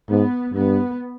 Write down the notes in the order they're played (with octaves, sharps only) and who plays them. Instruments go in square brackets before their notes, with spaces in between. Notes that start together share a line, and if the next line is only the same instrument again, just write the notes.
[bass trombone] G#2 [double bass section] B3
[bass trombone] G2 [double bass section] B3